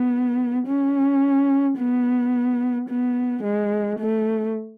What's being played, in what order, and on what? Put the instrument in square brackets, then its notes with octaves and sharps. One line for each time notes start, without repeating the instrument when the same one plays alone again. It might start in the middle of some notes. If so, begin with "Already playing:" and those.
Already playing: [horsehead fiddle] B3
C#4
B3
B3
G#3
A3